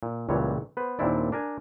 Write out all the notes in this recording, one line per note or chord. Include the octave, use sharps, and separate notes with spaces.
A#2
C#2 A#2 E3 G3 C#5
B3 B4 C5
D#2 A#2 C4 D4 E4 D5
D4 A#4 G#5